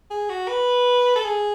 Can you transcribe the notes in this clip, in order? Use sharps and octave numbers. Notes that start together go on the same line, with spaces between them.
G#4
F#4
B4
A4
G#4